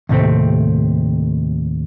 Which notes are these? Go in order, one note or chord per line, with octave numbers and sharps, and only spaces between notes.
D#2 A2 C3 A3 C4